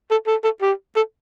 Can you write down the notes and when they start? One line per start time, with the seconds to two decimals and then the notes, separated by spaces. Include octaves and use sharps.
0.11 A4
0.27 A4
0.44 A4
0.61 G4
0.96 A4